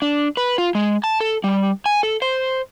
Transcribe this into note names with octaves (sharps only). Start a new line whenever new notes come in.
D4
B4
F4
G#3
A5
A4
G3
G#5
A4
C5